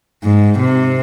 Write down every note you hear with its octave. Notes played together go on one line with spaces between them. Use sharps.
G#2
C3